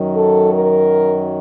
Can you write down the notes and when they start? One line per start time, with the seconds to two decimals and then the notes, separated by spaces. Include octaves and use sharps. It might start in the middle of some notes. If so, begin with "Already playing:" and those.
Already playing: F#2 D#3 F#3
0.16 A4
0.54 A#4